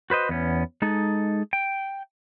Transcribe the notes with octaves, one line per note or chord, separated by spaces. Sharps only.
F#4 B4 C5 D#5
E2 B3 C#4
G#3 D#4 G#4 A4
G5